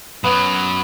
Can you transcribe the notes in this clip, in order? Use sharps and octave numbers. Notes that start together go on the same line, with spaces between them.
F#2 F#3 B3